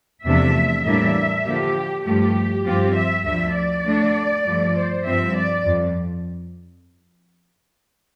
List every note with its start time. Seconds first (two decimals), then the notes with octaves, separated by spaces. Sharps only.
0.25 E2 C3 F3 A3 D4 E5
0.85 A2 E3 G3 A#3 D4 E5
1.45 D3 F3 A#3 G4
2.05 G2 F3 A3 G4
2.65 G2 F3 C4 F4 G4
2.95 E5
3.25 D2 D3 F3 E5
3.55 D5
3.85 D3 A3 D4
4.45 G2 F3 A3
4.75 C5
5.05 G2 F3 C4 E5
5.36 D5
5.65 F2